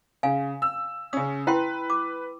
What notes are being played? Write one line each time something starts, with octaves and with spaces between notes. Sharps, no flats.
C#3 F5 G#5
E6
C#3 C#4 D#6
E4 B4 G5 C6
D6